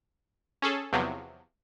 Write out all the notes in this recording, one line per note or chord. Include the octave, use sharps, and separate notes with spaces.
C#4 G#4 A4
E2 C3 F3 F#3